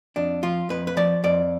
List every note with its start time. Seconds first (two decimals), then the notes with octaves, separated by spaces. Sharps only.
0.16 F2 D4
0.43 F3 F4
0.69 F2 B4
0.87 B4
0.97 F3 D5
1.24 F2 D5